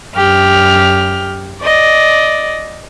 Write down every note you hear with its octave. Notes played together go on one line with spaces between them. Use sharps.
F#2 G4 F6
D5 D#5